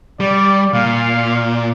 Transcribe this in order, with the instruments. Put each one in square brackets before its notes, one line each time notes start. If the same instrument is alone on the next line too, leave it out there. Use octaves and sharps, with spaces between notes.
[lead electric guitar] G3 [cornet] D5
[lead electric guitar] A#2 [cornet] F5